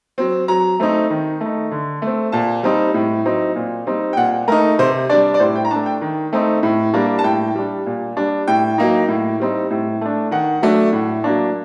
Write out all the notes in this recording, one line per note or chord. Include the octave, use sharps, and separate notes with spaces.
F#3 C4
F#3 A#5
A3 C4 D#4
D#3
A3 D#4
D3
A3 C4
A#2 A5
G3 C4 D#4
A2
F#3 C4 D#4
A#2
G3 C4 D#4
G5
A#2 F#5
A3 D#4 A#4
C3 C5
G3 D4 D5
D5
A2 C5
G5
A#5
A3 D4 A5
G5
D#3
A3 C4 D#4
A2
G3 A#3 D4
A5
A2 G5
G3 D4
A#2
G3 D4
A2 G5
F#3 A#3 D#4
A2
G3 C4 D#4
A2
A3 D4
D#3 F#5
F#3 A3 D4
A2
F#3 A#3 D4